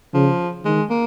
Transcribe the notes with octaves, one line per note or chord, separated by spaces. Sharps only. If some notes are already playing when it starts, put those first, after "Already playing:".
C#3 F3
D#3 G#3
A#3